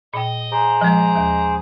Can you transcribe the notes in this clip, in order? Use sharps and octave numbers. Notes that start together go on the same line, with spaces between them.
A#2 D#5 G5
G#4 C5 A#5 D6
F3 G#3 D#5 A#5
D#2